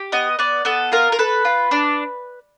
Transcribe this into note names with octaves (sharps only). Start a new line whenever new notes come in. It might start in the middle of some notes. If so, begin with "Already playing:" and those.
Already playing: G4
B3 D#5
B3 D5
B3 A4
F4 A#4
A#4
A4 B4
F4
D4